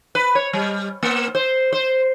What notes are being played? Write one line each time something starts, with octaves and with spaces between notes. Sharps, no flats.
B4
C#5
G3
A#3
C5
C5